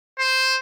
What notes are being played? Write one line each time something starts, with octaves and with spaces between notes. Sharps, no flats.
C5